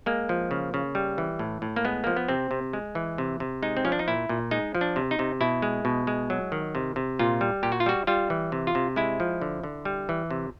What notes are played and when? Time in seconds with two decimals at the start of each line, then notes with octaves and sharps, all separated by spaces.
0.06 G#3 A#3
0.29 F3
0.51 C#3
0.74 C#3
0.95 G3
1.18 E3
1.39 A2
1.62 A2
1.76 A#3
1.85 G#3 B3
2.04 F3 A#3
2.16 B3
2.28 C3 C4
2.51 C3
2.73 G#3
2.95 E3
3.18 C3
3.40 C3
3.62 G#3 D#4
3.77 C4
3.85 F3 C#4
3.92 D4
3.99 D#4
4.08 A#2 E4
4.29 A#2
4.51 G#3 D#4
4.75 F3
4.81 D4
4.96 C3
5.11 D#4
5.19 C3
5.41 B2 E4
5.62 G#3
5.85 B2
6.07 G#3
6.30 F#3
6.52 D#3
6.75 C3
6.96 C3
7.19 A#2 F4
7.41 G3
7.63 A#2 G4
7.72 F#4
7.80 F4
7.86 G3 F#4
8.07 G3 F4
8.30 E3
8.52 C3
8.67 F4
8.75 C3
8.96 G#3 E4
9.20 F3
9.42 D3
9.64 D3
9.85 G3
10.09 E3
10.31 C3